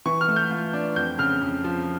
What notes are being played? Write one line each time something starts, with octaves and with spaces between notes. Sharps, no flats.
E3 C#6
F6
A3
G6
F4
D4
F2 G6
C#3 F6
F2
F3